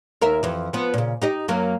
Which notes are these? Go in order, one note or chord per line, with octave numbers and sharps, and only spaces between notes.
D#2 A#4 E5
F2 E3
F3 B3
A#2 C#3
D#4 G4 D#5
F#2 F#3 A#3